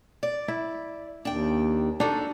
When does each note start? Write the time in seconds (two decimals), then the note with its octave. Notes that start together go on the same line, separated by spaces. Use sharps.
0.23 D5
0.48 E4
1.25 D#2 D4 G5
2.00 D4 D#4 F#4 A4